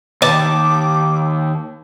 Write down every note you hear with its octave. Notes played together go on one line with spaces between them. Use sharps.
D#2 A5 D6